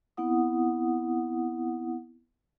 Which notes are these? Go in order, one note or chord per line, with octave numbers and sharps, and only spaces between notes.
B3 C4 E4 F#5 D#6